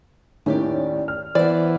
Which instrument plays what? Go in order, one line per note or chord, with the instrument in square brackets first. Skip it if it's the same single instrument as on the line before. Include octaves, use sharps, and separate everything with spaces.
[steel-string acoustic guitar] D#2 G4 D5 [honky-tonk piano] A2 D#3 C#4
[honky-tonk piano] F6
[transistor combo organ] E3 [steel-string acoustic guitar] B3 C5 [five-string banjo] D5